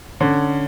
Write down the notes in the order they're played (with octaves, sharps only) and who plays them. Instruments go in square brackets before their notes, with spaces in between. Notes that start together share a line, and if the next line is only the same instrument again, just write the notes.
[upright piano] D3 [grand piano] C#4